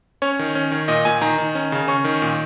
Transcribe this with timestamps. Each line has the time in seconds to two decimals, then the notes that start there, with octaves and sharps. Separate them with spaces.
0.22 C#4 C#5
0.39 D#3
0.55 C#4
0.72 D#3
0.88 A#2 D#5
1.05 A#2 G#5
1.22 D#3 A#5
1.38 D#3
1.55 C#4
1.72 C#3
1.88 C#4 C#6
2.04 D#3
2.22 A#2